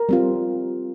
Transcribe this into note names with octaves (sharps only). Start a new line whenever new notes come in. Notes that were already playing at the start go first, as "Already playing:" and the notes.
Already playing: A#4
G3 C4 F4